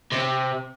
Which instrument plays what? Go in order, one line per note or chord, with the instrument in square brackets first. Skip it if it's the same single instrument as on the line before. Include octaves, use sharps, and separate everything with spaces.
[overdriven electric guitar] C3